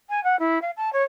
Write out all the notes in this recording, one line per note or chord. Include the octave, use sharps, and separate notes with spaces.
G#5
F#5
E4
F5
A5
C#5